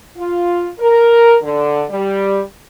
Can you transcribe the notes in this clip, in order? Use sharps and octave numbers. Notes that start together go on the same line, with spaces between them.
F4
A#4
D3
G3